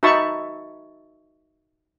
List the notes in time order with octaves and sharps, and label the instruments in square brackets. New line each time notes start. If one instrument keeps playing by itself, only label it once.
[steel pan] D#4 F#4 E5 A5 B5 C#6